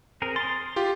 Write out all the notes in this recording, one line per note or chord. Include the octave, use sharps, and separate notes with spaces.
C4 G#4 A#4
C6 D#6 A6
F4 G4